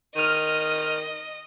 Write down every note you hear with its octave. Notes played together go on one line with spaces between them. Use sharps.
D#3 D#5 F6 D#7